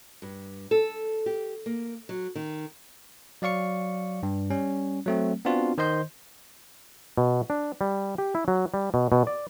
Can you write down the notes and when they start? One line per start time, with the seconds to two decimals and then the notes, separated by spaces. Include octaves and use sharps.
0.22 G2
0.71 A4
1.26 G4
1.66 A#3
2.09 F#3
2.35 D#3
3.42 F#3 D5 F5 C#6 C#7
4.23 G2
4.50 G3 C#4
5.06 F#3 A3 C4
5.45 B3 C4 D4 F4 F#4
5.78 D#3 C5 D#5 C6 G6
7.17 B2
7.50 D4
7.81 G3
8.18 G4
8.35 E4
8.48 F#3
8.74 G3
8.94 B2
9.12 B2
9.27 D5